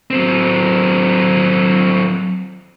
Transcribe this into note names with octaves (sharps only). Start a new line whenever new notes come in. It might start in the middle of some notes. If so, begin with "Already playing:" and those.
F#3 C4